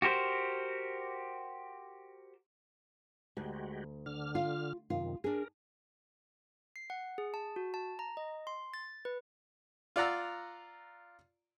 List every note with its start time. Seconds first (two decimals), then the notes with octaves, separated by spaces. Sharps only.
0.02 F#4 G4 A#4 C5
3.37 D2 G#3 F#4 G4
4.06 D3 F6
4.35 F4
4.90 F#2 C3 D#3 F4
5.24 D4 G#4 A#4
6.76 C7
6.90 F#5
7.18 G#4
7.34 A5
7.56 F#4
7.74 A5
7.99 A#5
8.17 D#5
8.47 C6
8.74 A6
9.05 B4
9.96 F4 D5 F#5 A#5 E6